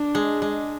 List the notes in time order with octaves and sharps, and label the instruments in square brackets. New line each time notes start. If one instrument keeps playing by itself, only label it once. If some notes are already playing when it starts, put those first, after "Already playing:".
Already playing: [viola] D4
[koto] G#3
G#3